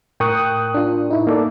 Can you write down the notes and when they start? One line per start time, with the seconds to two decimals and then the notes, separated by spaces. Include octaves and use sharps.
0.20 A2 A#4 G5 C#6 D#6 F#6
0.74 D4 F4
1.10 D#4 E4
1.27 A#3 A4 D5